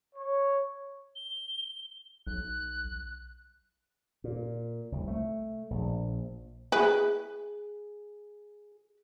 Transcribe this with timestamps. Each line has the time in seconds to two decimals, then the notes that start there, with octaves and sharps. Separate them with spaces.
0.15 C#5
1.15 G7
2.27 B1 F#6
4.24 A#2
4.92 C2
5.08 A3
5.70 A#1
6.72 E4 G#4 B4